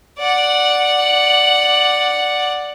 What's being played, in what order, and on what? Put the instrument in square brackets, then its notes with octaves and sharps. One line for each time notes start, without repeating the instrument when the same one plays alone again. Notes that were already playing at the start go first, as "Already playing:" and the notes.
[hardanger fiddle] D5 F#5